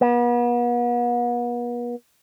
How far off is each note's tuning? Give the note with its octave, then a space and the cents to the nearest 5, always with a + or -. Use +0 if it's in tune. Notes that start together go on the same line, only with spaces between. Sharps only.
B3 -40